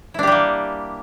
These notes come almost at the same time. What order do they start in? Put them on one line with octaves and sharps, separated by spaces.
E4 D4 G4 G3 A#3